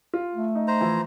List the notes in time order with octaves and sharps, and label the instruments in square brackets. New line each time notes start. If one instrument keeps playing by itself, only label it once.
[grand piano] F4
[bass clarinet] A3
[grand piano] D#4
[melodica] C5 A#5
[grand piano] E3 F3 E4